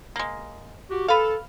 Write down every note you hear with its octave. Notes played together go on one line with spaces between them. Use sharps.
G#3 A#3
F#4 G4
A4 B4 F5